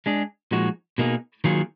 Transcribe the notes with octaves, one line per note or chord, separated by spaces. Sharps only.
G#3 D4 G#4
A#2 F3 G#3 D#4 F#4
B2 A#3 D#4 G#4
D#3 F#3 A#3 F4 G#4